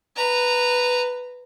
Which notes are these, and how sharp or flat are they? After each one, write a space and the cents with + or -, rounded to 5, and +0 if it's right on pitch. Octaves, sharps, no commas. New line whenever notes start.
B4 +0 A#5 -15